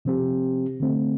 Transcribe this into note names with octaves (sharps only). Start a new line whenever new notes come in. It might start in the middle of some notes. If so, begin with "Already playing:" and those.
C3 F3 C4 G4
D3 A3 C4